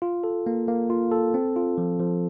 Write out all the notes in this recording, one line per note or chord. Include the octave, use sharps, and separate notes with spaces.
F4
A4
A#3
A#3
F4
A4
C4
F4
F3
F3